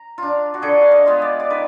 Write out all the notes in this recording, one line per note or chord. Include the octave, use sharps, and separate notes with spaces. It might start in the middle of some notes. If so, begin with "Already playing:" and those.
Already playing: A#5
D4 F4
F#4
D3 G#4
F5
D#5
G#3 B3 F4
D5
D5
D#3 B4